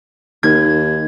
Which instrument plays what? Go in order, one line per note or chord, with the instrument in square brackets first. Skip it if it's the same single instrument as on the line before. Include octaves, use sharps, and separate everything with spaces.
[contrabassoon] D#2 [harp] G#6